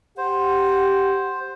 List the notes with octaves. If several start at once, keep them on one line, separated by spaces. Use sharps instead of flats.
G4 C5 F#5